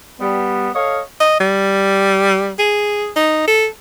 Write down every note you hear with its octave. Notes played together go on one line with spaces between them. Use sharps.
G3 B3
A4 C#5 D#5 F5
D#5
G3
G#4
D#4
A4